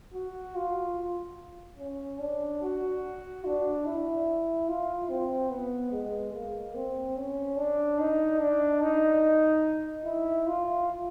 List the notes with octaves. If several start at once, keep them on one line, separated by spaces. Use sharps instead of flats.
F#4
F4
C#4
D4
F#4
D4
E4
F4
C4
B3
G#3
A#3
C4
C#4
D4
D#4
D4
D#4
E4
F4